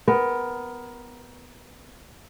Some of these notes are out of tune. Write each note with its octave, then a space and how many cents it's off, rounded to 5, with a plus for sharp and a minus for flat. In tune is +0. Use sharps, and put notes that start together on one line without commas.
B3 +10 A#4 +20